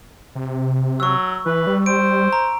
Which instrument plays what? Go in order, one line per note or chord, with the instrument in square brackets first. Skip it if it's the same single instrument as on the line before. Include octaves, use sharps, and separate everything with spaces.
[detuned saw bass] C3
[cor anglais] F#3 [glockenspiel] C#6 E6
[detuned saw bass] E3 [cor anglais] B4
[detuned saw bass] G3
[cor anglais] C5 [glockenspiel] D7
[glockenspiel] A#5